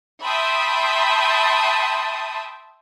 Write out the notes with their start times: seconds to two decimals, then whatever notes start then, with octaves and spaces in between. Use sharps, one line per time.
0.23 E5 G5 A5 B5 C6 D#6